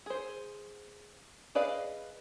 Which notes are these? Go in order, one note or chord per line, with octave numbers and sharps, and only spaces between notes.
G#4 C5
G#4 B4 D5 D#5 F5